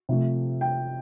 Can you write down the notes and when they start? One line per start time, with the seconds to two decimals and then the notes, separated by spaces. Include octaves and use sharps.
0.09 C3 F3 A3
0.61 G5